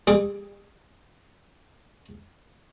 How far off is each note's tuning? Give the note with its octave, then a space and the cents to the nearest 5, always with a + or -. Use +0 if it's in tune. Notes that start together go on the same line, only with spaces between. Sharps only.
G3 +40 G#4 +0 D6 +0